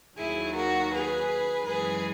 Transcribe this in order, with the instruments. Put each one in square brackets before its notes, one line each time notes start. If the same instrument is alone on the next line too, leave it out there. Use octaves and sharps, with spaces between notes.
[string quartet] D#2 D#3 F#3 E4 G#4
F#4 A#4
G#4 B4
F#2 E3 G#3 G#4 B4